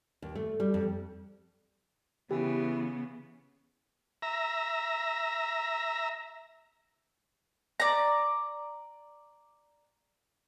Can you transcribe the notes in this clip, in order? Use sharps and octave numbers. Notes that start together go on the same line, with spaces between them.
D#2
A3
G3
F2
C#3 E3 B3 G4
E5 A#5
D5 A#5